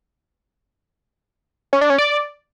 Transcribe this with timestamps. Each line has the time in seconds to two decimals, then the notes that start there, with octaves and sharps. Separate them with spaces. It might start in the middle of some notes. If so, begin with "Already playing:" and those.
1.73 C#4
1.81 D4
1.90 C#4
1.98 D5